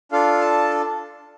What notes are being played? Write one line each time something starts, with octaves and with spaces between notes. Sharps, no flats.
D4 F4 A4 F5
A5